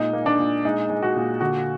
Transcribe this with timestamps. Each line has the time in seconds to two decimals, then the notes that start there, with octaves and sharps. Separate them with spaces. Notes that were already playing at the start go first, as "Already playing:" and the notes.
Already playing: A#2 G#3 D#4
0.13 A#3
0.26 D4
0.39 A#2
0.65 G#3 D#4
0.90 G#3
1.03 F#4
1.16 A#2
1.41 D3 F#4